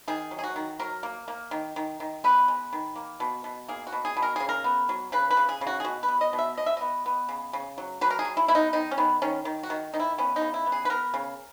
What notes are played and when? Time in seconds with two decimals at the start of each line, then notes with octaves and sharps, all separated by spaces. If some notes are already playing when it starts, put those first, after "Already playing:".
0.08 D#3 G#4
0.31 F#3
0.39 G#4
0.44 F#4
0.56 D#3
0.79 F#3 A#4
1.03 A#3
1.28 A#3
1.51 D#3
1.76 D#3
2.00 D#3
2.24 B3 B4
2.48 G#3
2.73 D#3
2.96 A#3
3.20 B2
3.44 B2
3.69 A#3 G#4
3.87 F#4
3.92 B2
4.05 G#4
4.17 B2
4.22 A#4
4.36 C#3 G#4
4.49 A#4
4.64 B3
4.89 F#3
5.12 C#3 B4
5.31 B4
5.37 C#3
5.49 G#4
5.61 C#3
5.67 F#4
5.80 G#4
5.85 B2 F#4
6.03 B4
6.08 B3
6.21 D#5
6.33 B2
6.39 E5
6.57 B2 D#5
6.66 E5
6.77 B3 D#5
7.06 B3
7.29 C#3
7.53 C#3
7.78 F#3
8.01 F#3 B4
8.10 A#4
8.19 G#4
8.25 F#3
8.37 E4
8.48 B3 E4
8.55 D#4
8.73 D#3 D#4
8.91 C#4
8.98 D#3 B3
9.22 D#3 C#4
9.45 D#3
9.63 F#4
9.70 D#3
9.94 D#3 D#4
10.00 E4
10.18 B3 C#4
10.36 D#4
10.42 C#3
10.54 E4
10.66 B3
10.72 G#4
10.85 B4
10.90 B3 A#4
11.14 C#3